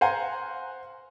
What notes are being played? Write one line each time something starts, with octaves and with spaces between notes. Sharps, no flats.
C5 F5 F#5 G#5 A#5